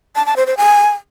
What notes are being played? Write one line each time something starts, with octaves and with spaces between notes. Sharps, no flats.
A5
A5
C5
C5
G#5